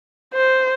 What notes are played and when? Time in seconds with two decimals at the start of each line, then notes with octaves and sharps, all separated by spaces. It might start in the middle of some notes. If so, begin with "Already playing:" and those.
0.34 C5